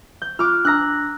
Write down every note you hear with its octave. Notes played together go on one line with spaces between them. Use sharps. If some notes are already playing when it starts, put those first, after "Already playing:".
G6
F4 D6 F6 F#6
D4 A#5 E6 F#6 A#6